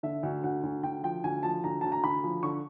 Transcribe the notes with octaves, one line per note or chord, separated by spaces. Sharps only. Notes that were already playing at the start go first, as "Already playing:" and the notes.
D3 E5
D2
D2 F#5
D2
D2 G5
F3 G5
D2 G#5
F3 A5
D2 A#5
D2 A5
A#5
D2 B5
F3
D3 C#6